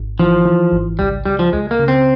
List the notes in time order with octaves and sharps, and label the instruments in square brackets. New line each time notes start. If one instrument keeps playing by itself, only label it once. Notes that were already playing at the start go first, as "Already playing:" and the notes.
Already playing: [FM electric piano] G#1
[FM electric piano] E3 [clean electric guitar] F3
[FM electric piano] E3
G#1
[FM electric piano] C#2 [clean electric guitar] G3
[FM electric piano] C#2 [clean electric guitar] G3
[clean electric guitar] F3
[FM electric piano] C#2 [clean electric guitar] G#3
[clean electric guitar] A#3
[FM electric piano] C#3
[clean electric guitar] C4